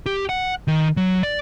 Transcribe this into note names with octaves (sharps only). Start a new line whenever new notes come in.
G4
F#5
D#3
F#3
D5